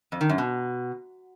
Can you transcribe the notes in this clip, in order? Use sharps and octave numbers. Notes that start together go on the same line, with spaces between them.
F2
D#3
F#2
B2